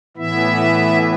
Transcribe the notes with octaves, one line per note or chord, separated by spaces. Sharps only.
A2 E3 B3 E4 E5